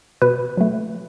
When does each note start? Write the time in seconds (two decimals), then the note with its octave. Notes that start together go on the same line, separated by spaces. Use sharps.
0.22 B2 B4
0.57 F#3 A3